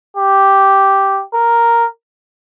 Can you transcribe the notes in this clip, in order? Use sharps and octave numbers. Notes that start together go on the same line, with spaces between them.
G4
A#4